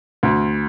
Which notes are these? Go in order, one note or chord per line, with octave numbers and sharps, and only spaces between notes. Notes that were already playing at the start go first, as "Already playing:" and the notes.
D2